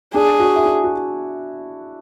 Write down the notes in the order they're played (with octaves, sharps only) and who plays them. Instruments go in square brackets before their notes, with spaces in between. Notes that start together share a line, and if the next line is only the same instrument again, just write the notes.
[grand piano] D4 [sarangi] G#4
[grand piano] F#4
E4
D4
F#4